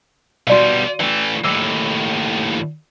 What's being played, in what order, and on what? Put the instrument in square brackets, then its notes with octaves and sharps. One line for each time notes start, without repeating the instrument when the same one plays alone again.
[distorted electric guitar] B2 G3 [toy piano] F#4 D5 F5
[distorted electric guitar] E3 A3 [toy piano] G5
[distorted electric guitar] D#2 A2 [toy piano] D6 E6